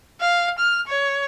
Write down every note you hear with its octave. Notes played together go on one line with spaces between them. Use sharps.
F5
F6
C#5